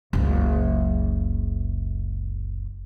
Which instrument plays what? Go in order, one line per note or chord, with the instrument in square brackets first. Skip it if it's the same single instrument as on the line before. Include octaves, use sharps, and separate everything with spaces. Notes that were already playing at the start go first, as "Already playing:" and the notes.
[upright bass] F#1 C#2